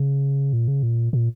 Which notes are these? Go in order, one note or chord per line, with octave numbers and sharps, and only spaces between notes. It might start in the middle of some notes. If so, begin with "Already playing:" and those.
Already playing: C#3
A#2
C#3
A#2
A#2